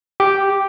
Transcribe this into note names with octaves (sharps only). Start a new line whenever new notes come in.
G4